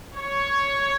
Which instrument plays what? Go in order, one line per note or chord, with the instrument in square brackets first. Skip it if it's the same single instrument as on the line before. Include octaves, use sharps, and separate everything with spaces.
[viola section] C#5